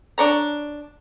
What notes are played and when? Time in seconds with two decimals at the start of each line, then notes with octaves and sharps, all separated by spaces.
0.18 D4 C#5 A#5